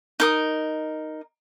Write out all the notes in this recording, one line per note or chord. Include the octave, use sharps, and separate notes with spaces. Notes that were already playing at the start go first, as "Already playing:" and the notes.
D#4 A#4 D#6